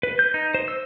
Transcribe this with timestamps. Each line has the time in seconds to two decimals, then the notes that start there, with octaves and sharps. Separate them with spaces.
0.03 B4
0.19 G6
0.34 D#4
0.54 C5
0.68 E6